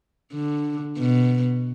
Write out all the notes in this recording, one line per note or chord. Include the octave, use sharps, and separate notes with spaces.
D3
B2